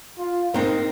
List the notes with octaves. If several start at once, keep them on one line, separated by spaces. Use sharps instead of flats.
F4
G#2 C4 D#4 A#4